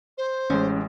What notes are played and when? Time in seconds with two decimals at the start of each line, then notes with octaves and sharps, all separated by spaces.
0.17 C5
0.50 A1 G#3 C#4